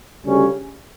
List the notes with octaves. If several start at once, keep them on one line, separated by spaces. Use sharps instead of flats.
D2 C#3 G3 C#4